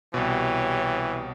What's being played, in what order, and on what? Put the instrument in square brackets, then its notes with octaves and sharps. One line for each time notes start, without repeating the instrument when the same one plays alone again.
[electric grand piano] C2 B2 [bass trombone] E3 [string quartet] G4 C#5